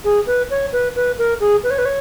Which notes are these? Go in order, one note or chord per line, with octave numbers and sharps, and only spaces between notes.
G#4
B4
C#5
B4
B4
A#4
G#4
B4
C#5
B4
C#5